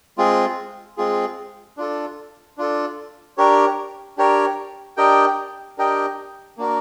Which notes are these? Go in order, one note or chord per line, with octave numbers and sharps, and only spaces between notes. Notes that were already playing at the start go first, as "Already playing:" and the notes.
G#3 C4 F4 G#4
G#3 C4 F4 G#4
D4 F4 A4
D4 F4 A4
D4 G4 A#4 C#5
D4 G4 A#4 C#5
D4 G4 A#4 D#5 G5
D4 G4 A#4 D#5 G5
A#3 D4 F#4 A#4